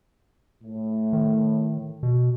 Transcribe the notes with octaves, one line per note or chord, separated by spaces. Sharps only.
A2
D#3
B2